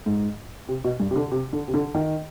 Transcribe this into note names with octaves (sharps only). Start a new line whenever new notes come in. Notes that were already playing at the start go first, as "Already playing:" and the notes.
G#2
C3
B2
G2
C3
D3
C3
D3
C3
D3
D#3